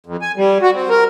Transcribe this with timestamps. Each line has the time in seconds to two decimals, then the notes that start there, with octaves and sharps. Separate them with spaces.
0.06 F2
0.22 G#5
0.36 G3
0.62 F#4
0.74 C4
0.90 A#4